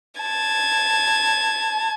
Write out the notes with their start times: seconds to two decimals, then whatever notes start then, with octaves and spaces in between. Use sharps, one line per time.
0.21 A5 G#6